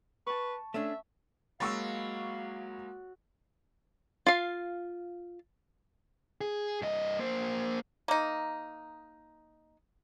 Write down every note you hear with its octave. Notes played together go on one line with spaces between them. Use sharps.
B4 A5 C#6
A3 C#4 D4 E5
F#3 G#3 A#3 F5 B5 C#6 E6 A6
F4 F5
G#4
G2 D#5
A#3 C5
A#3 D#4